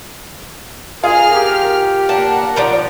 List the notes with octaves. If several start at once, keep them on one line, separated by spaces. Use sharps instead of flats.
F4 G#4 A#4 F6
G4
A#3 D4 A#4 F#5 A5
D#3 F3 D4